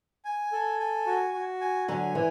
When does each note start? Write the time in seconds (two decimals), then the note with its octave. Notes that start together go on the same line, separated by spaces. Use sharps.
0.25 G#5
0.52 A4
0.79 G#5
1.07 F#4
1.34 F#4
1.61 G#5
1.88 D3 F#3 G#5
2.15 E3